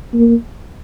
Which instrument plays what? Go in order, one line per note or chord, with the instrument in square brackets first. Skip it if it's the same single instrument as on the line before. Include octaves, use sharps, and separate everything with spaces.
[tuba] A#3